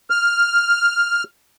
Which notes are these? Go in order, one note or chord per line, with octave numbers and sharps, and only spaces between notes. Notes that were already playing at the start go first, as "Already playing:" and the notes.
F6